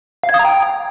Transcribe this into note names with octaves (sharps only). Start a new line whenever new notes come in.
F5
G#6
D#6
A#5
G5